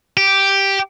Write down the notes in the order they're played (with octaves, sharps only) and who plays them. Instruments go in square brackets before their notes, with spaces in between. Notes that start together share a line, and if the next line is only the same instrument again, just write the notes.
[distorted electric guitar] G4